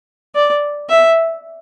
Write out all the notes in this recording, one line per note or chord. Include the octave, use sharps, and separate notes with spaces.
D5
E5